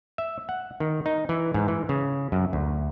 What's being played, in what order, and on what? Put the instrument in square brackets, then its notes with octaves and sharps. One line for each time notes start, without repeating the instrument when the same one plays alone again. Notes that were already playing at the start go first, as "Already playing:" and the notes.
[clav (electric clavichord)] E5
F#5
D#3
D#4
E3
G#2
E3
C#3
F#2
D2